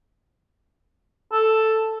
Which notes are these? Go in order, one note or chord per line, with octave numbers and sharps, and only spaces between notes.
A4